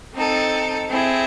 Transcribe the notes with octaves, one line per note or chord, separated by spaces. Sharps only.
C4 D#4 A4
C4 E4 G#4